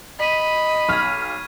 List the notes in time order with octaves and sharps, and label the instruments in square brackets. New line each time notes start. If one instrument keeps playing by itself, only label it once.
[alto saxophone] D#5 [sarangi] B5 [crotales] B6 D#7
[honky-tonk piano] B1 F6 [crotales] C#6 G#6